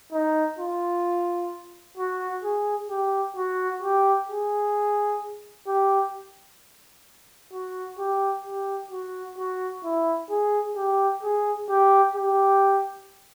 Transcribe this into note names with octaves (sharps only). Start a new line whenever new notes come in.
D#4
F4
F#4
G#4
G4
F#4
G4
G#4
G4
F#4
G4
G4
F#4
F#4
E4
G#4
G4
G#4
G4
G4